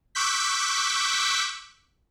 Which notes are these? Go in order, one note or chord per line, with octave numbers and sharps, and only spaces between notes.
C#6 D6 E6 F#6 G6 B6